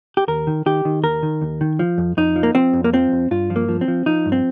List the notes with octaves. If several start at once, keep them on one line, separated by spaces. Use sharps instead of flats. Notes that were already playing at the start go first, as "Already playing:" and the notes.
G4
D#2 A#4
D#3
D#3 G4
D#3
D#2 A#4
D#3
D#2
D#3
F3
F2
F2 D#4
F3
A#3
F3 C4
F2
A#3
F3 C4
F2
G2 F4
F3
A#3
F3
C4
F3
F3 D#4
G2
C4